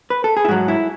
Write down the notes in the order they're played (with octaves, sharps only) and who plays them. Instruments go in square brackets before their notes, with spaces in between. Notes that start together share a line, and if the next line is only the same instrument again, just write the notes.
[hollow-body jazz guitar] B4
A4
G#4
E4
G#2 F#3 F#4
E4